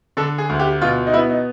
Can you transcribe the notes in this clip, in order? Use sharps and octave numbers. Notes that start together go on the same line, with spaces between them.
D3 A4
G#4
D2
G4
B2 F4
D#4
B3 E4
D#4